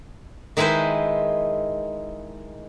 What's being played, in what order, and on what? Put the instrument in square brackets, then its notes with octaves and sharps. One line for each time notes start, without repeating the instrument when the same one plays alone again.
[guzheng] D#3 G#3 E4 G#4 B4 C5